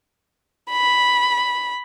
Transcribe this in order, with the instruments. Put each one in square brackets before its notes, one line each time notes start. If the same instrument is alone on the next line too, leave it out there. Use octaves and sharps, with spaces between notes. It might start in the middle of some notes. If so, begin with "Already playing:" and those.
[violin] B5